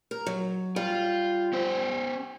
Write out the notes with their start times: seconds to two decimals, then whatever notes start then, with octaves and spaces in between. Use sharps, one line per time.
0.11 A#4
0.26 F#3
0.76 G3 F4
1.53 C#4 C5